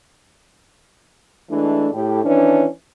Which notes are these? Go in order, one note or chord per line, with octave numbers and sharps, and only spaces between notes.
E3 G#3 A3 D4
A2 G4
D#3 E3 C#4 D4